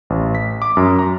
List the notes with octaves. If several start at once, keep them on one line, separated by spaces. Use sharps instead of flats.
A1
B6
D6
F#2
A#5